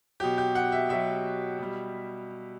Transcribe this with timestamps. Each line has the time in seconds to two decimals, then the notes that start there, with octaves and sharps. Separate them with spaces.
0.20 B2 F#3 G4
0.38 G4
0.55 F#5
0.72 E5
0.89 B2 F#3 E5
1.59 B2 G3